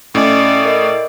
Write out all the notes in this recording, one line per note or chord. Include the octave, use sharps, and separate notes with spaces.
A2 C#4 D5 D#5 G#5
A#4 D#5